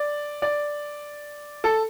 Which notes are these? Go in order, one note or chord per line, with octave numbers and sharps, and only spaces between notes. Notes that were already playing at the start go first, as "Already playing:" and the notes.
Already playing: D5
D5
A4